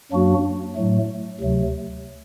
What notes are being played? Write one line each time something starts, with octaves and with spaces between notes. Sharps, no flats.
F#2 F#3 A#3 D4 F#4
A2 F#3 A3
D2 C3 F#3 A3